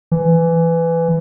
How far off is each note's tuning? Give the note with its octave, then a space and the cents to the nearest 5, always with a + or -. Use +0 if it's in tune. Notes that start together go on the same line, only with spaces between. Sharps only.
E3 +15